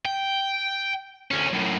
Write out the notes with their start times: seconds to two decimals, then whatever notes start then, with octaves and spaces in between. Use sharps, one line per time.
0.05 G5
1.31 D2 C#4
1.53 F#2 A2